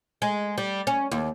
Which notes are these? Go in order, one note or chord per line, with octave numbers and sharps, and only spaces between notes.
G#3
G3
C#4
D#2